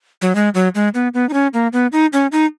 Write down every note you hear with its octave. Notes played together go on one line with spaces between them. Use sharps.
F#3
G#3
F#3
G#3
B3
B3
D#4
C#4
A#3
B3
D#4
C#4
D#4